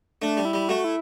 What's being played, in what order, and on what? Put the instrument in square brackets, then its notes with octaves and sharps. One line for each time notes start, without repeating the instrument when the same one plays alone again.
[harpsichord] A3 [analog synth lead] D4
[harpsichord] G3
[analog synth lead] E4
[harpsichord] G3
[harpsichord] A3 [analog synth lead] F#4
[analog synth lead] E4